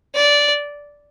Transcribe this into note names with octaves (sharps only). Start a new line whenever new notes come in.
D5